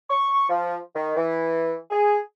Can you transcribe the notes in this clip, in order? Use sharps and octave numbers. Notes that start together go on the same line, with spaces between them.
C#6
F3
D#3
E3
G#4